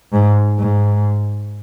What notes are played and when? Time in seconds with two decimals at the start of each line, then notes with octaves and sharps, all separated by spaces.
0.13 G#2
0.59 G#2